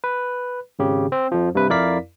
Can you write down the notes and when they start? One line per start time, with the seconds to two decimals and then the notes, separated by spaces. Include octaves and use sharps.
0.04 B4
0.79 G#1 C#3 G4
1.12 C4
1.32 F2 F3
1.55 G2 C3 B4
1.69 F2 E4 A#4 D5 F5 B6